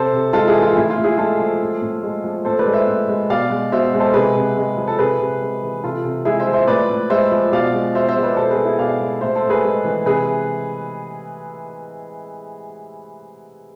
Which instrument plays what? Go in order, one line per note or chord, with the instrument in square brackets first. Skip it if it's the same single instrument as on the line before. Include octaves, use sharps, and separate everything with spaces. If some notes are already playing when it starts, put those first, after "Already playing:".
Already playing: [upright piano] C3 A4 C5
C3
G#3 F4 A4
E4 G#4
E3
F4
A2 E4
F4
A2
E4 G#4
G#3 F4 A4
F3
A2
A2
G#3
F3
A2 A4 C5
B4 D5
G#3
C5 E5
A2
G#3
B2 D5 F5
G#3
B2 C5 E5
G#3
A4 C5
C3 G#4 B4
C3
G#3
F3
A4
C3 G#4 B4
C3
G#3
E3
C3 F4 A4
C3
G#3 E4 G#4
C5 E5
F3
C5 E5
A2 B4 D5
A2
G#3 C5 E5
F3
B2 D5 F5
G#3
B2 C5 E5
C5 E5
G#3
B4 D5
B2 A4 C5
G#4 B4
G#3
E4 G#4
B2 D5 F5
G#3
A2 C5 E5
A4 C5
A2
G#4 B4
G#3
E3
C3 G#4 B4